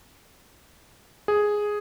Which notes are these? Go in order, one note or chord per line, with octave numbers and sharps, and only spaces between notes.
G#4